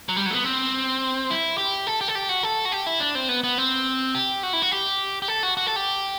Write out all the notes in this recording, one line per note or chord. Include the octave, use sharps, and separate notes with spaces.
F#3
G3
F#3 A3
B3
C4
E4
G4
A4
G4
A4
G4
F#4
A4
F#4
G4
E4
D4
C4
B3
B3
C4
G4
F#4
E4
F#4
G4
G4
A4
F#4
F#4
A4
G4